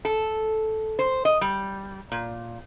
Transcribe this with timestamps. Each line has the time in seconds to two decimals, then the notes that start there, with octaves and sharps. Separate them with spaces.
0.05 A4
0.99 C5
1.25 D#5
1.41 G3
2.12 A#2